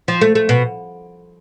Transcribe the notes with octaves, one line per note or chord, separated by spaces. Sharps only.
F3
A3
A3
B2